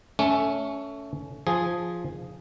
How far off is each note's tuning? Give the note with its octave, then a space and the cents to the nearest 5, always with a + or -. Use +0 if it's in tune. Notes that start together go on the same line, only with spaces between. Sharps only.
A3 +0 C#4 +20
F3 +0 G#4 +0